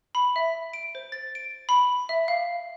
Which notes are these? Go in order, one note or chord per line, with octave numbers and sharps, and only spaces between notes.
B5
E5
D7
C5
A6
D7
B5
E5
F5